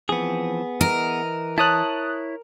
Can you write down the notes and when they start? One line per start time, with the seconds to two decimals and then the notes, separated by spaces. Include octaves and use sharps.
0.09 E3 F3 B3 C4 G#4
0.81 E3 A#4 D#5
1.58 E4 C#5 A5 D#6 F#6